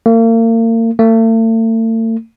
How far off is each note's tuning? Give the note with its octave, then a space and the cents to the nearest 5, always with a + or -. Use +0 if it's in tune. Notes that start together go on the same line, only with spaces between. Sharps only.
A#3 -40
A3 +40